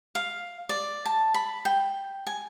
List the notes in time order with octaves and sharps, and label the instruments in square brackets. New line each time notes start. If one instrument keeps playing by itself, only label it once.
[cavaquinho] F5
D5
A5
B5
G5
G#5